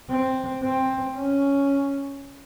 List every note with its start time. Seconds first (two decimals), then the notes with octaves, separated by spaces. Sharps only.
0.10 C4
0.64 C4
1.17 C#4